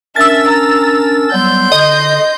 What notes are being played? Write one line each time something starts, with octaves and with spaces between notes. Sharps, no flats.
C#4 D4 A#4 E5 E6 A6
A#5
F#3 G3 B3 C6 G6
D3 D#5